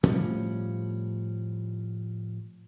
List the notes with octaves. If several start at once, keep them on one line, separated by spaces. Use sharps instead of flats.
A2 F3 G3 C#4